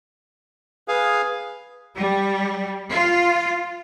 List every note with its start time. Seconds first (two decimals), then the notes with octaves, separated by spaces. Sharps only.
0.88 G#4 B4 F5
1.95 G3
2.90 F4